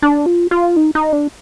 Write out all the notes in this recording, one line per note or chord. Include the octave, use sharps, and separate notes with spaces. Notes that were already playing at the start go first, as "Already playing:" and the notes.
D4
F4
F4
D#4
D#4
D4